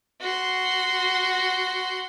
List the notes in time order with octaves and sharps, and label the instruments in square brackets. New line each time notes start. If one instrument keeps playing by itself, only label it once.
[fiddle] F#4 C6